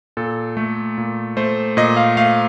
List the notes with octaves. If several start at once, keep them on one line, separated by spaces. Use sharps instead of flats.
A#2 A4
A3
A#2
A3 C5
A#2 D#5
F5
A3 F5